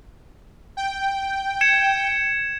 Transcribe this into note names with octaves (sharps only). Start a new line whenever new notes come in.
G5
G#6 C#7 E7